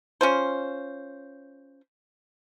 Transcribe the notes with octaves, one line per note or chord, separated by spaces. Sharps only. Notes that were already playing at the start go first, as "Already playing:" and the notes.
C#4 F4 C5